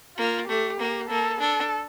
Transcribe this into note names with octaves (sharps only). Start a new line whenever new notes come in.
A#3 F4
A3 G4
A#3
A#3 A4
D4 A4